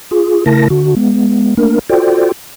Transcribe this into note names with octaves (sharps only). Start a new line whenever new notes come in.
F4 G#4
C#3 A3 E4 A#4 A5 A#6
D3 F#4
G#3 B3
A3 A#3 D4 A#4
F4 F#4 A4 C5 D5 G5